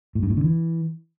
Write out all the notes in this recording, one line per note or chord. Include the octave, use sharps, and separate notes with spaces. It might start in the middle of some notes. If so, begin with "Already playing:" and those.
A2
G2
A2
D3
E3